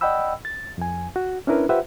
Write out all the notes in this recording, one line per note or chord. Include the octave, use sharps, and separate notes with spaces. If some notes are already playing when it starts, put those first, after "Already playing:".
D5 D#5 F#5 G5 B5 E6
A6
F2 G#5
F#4
C#4 D4 E4 A#4 B4
F4 G4 B4 C5 E5 F#5